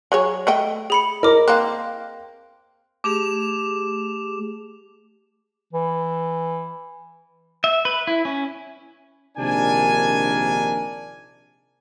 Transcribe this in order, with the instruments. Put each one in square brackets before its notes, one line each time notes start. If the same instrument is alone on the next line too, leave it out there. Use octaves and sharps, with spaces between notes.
[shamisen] F#3 G#4 C#5
A3 D#5 G5
[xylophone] G#4 B5 C#7
[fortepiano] A#4 [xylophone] D#5 D6
[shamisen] A#3 C4 [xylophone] F#6
[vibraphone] A3 G4 G#4 [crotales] D6 E7 F7
[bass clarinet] E3
[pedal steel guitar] E5
B4
E4
C#4
[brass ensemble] A#1 C3 D#3 D4 A#4 G#5